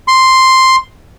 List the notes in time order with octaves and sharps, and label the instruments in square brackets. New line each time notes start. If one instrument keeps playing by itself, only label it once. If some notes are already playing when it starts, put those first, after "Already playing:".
[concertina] C6